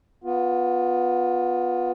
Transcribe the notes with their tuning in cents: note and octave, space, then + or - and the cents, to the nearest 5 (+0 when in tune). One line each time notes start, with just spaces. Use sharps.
B3 +0 F4 +20